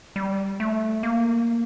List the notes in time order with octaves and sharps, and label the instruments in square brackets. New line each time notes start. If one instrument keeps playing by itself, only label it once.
[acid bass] G3
A3
A#3